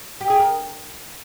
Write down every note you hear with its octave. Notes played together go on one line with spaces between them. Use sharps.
G4
G#4
A#4